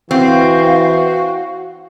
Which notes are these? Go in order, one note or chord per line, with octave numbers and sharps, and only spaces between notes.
E3 C4 F#4 F5